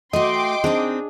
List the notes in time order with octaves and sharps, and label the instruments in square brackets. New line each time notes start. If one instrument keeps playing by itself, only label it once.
[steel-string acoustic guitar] A3 F#4 [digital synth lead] D#5 [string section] G5 C6 D6
[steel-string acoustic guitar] C4 D#4 [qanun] D4 G#4